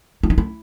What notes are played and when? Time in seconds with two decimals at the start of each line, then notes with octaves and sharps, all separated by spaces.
0.23 E4
0.30 D#4
0.38 E4